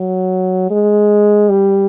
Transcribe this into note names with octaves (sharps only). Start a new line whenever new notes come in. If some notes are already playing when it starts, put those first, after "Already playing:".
Already playing: F#3
G#3
G3